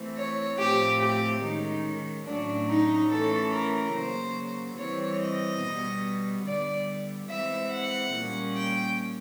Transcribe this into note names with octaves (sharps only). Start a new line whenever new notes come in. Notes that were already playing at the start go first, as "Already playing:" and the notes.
Already playing: E3 A3 C4
C#5
A2 F3 A3 C4 G4
G4
D#3 G#3 C#4 D#4
A2 F#3 A3 C#4 D4
D#4
E3 A3 C#4 A4
A#4
C#3 F#3 A#3 C5
E3 G3 C4 C#5
D#5
B2 G3 B3
D3 G3 B3 D5
E3 G#3 C4 E5
F#5
A#2 G3 A#3 C#4
G5